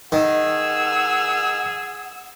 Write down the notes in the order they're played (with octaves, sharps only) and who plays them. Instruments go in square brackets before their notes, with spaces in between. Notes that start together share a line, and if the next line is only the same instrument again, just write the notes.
[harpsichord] D#3 [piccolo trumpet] G#4 [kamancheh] F#5 E6